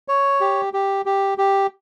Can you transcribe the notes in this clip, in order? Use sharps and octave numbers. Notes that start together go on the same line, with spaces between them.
C#5
G4
G4
G4
G4